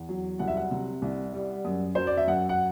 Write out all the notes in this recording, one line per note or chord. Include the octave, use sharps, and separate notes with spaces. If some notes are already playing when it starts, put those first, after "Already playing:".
Already playing: E2
F#3
C2 F#5
E5
F#5
C3
C2
G3
F#2
F#3 C5
D5
E5
F#2 F#5
F#5